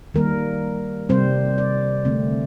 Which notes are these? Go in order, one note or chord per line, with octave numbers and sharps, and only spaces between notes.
D#3 G3 A#3 A#4
C3 G3 C4 C5
D5
D3 A3 C4